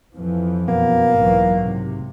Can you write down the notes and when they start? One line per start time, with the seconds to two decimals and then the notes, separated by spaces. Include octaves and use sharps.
0.14 F2 E3 F3
0.68 F#2 B2 A#3 B3
1.16 B1 G#2 E3 F#3
1.59 C3